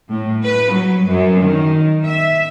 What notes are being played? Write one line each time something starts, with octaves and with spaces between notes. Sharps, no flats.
A2
B4
F#3
F#2
D#3
E5